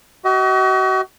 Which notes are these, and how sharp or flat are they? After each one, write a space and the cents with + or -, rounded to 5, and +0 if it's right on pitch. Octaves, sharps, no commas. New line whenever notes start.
F#4 +35 D#5 +30